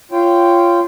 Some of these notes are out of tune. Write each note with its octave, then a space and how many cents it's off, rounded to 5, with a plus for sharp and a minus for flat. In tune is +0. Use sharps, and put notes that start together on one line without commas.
F4 -15 C#5 +0 G5 +0